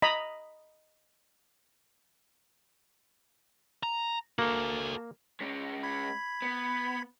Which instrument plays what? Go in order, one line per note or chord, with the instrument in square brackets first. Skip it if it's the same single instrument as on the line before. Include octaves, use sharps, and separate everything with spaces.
[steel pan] D#5 A#5 B5
[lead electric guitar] A#5
[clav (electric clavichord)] A#3 [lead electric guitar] F#4 A4
[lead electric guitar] G#3 C#4
[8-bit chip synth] B5 G#6 B6
[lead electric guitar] B3